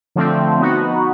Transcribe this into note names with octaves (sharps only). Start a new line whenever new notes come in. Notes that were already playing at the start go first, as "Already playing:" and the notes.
D3 F3 A3 C4
B3 D#4 F#4